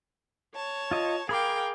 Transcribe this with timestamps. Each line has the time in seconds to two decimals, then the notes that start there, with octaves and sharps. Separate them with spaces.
0.55 C#5 A5
0.91 F4 D#5
1.29 G#4 A#4 F5 G5 B5 D6